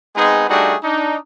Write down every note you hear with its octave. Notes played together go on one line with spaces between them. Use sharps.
G#3 B3 C4 D#4 G#4
G3 A3 D4 D#4 F#4 G#4
D4 D#4